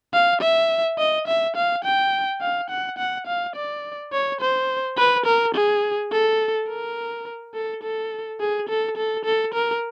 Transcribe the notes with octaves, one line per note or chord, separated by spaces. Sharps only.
F5
E5
D#5
E5
F5
G5
F5
F#5
F#5
F5
D5
C#5
C5
B4
A#4
G#4
A4
A#4
A4
A4
G#4
A4
A4
A4
A#4